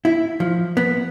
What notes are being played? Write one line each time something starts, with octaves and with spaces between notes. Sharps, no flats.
E4
F3
B3